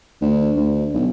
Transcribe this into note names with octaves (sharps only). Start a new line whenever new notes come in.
D2
D2
B1